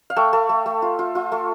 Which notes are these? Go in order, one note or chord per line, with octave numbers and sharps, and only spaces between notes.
F5
A3 G5
A3
A3
A3
F4
F4
F4
A3